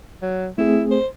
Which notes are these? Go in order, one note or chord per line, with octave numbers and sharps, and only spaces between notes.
F#3
A3 C4 E4 G#4
C5